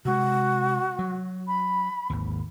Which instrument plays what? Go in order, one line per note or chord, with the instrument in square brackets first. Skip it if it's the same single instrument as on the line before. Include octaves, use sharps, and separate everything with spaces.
[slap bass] C3 G#3 [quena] F#4
[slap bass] F#3
[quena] B5
[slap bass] G#1 D#2